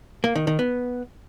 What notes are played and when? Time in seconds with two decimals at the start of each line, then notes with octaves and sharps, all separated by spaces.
0.24 A#3
0.35 D#3
0.47 D#3
0.59 B3